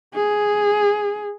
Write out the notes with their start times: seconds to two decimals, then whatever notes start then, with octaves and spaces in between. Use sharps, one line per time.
0.15 G#4